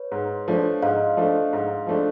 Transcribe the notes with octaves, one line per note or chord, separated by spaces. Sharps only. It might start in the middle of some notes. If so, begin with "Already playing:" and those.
Already playing: B4 C#5
G#2
F3 A3 D4
G#2 D#5 F5
F3 A3 D4
G#2
F3 A3 D4